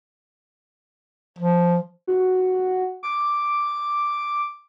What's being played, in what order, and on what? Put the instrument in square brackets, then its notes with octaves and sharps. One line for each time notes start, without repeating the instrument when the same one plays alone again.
[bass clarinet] F3
[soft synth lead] F#4
D6